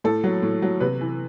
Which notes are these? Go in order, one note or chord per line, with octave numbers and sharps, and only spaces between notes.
A2 A4
F#3
A2
F#3
C3 B4
E3